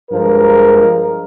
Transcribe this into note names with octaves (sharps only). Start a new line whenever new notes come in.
G2 F3 G#3 A#4